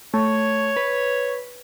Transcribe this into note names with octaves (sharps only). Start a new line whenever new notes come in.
A3 C#5
B4